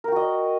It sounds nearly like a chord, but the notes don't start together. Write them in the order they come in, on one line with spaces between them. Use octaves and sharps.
A#4 G5 F#4 D#5